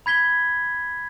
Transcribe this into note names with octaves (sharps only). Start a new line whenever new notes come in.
B5 G#6 B6 G7